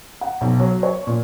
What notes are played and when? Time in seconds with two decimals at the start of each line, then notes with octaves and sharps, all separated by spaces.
0.21 F#5
0.41 B1
0.60 F#3
0.83 C#5
1.07 A#2